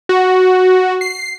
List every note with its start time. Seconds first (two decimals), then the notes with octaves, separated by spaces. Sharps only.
0.09 F#4
1.01 C7